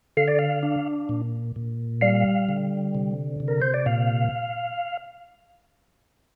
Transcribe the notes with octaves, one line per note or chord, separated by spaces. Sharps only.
D3 F5
D5
F5
D4
A#2
A#2
G3 F5
D3
C3
C3
A#4
C5
D5
A#2 F5